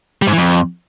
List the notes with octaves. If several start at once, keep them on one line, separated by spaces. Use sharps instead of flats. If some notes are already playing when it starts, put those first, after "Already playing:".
G3
G#2
E3
F2